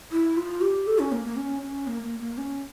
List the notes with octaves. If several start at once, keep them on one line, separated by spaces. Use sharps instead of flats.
E4
F4
G4
A4
C#4
A#3
A#3
C#4
C#4
A#3
A#3
A#3
C#4